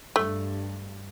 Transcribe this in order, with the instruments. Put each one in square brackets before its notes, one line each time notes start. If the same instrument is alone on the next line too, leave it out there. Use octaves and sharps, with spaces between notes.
[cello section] G2 [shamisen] A3